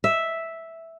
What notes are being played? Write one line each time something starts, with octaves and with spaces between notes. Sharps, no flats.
E5